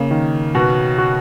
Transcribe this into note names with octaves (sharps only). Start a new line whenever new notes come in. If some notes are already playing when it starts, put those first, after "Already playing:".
Already playing: C#3 A#3
D#3
B2 F#4
F#4